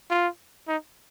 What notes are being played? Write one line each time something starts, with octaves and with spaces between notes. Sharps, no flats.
F4
D#4